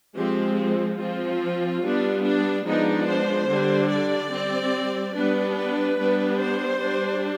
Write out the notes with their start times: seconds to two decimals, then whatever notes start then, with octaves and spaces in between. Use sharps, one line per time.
0.15 F3 G#3 C4 G4
0.98 F3 C4 F4
1.82 G3 B3 D4
2.23 D4
2.65 F3 G#3 B3 D4 D#4
3.07 C5
3.48 D3 G3 D4
3.90 D5
4.32 G3 C4
5.15 G3 B3 D4 B4
5.57 B4
5.98 G3 B3 D4
6.41 C5
6.82 G3 D4